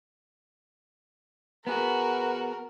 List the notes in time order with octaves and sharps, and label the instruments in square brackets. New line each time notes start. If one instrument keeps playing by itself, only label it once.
[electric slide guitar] B3 G#4 [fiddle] F#4 [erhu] A#4 [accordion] B4